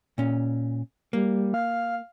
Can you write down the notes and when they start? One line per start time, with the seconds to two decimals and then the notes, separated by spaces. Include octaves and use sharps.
0.18 A#2 C#4
1.13 G3 A#3
1.54 F5